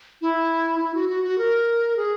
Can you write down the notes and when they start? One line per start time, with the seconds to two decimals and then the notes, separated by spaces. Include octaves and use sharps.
0.21 E4
0.80 E4
0.94 F#4
1.09 F#4
1.24 F#4
1.38 A#4
1.97 G#4